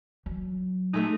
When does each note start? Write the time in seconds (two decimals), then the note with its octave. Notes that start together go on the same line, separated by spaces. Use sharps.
0.26 F#3
0.94 G#3 A3 D#4 A4